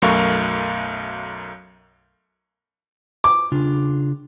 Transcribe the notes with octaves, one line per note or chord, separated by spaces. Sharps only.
B1 F#2 A3 A#4 F5 C#6
D6
C#3 D4 F4